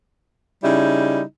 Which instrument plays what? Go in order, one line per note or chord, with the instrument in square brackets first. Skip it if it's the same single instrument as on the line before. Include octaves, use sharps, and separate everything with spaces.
[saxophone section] C#3 G3 D#4 E4